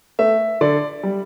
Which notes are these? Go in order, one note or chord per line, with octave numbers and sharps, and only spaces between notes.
A3 E5
D3 D5
G3